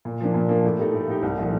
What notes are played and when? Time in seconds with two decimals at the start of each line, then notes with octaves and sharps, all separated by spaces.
0.05 A#2
0.20 F3 A#3 D4
0.34 A#2
0.49 F3 A#3 D4
0.65 A2
0.78 A3 D#4 G4
0.94 A2
1.08 A3 D#4 G4
1.23 C2
1.37 A#2 F3 A3 D#4